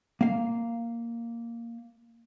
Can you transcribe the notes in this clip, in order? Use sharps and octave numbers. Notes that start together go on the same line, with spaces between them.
A#3 F5